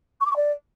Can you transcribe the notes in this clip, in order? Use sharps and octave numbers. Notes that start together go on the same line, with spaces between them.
C#6
D6
C#6
D5